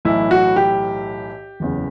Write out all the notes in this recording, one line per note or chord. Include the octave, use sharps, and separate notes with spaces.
B1 A2 E3 E4
F#4
G4
F#1 E2 C#3